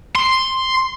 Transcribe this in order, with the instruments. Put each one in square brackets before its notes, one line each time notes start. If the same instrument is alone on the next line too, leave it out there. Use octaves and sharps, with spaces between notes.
[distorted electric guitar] C6